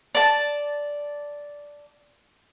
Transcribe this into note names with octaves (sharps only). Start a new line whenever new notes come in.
D5 A5